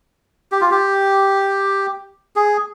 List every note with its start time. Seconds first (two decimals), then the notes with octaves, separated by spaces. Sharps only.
0.52 G4
0.61 F4
0.71 G4
2.36 G#4